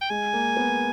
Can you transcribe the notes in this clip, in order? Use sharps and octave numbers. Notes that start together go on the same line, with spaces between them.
G5
G#3 G#5
A#3
B3